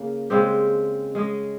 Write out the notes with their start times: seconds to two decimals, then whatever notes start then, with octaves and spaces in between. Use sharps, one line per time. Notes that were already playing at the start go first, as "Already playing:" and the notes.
Already playing: C#3 A#3
0.30 C#3 G#3 C4 G4
1.15 G#3 C#4 G#4 D#5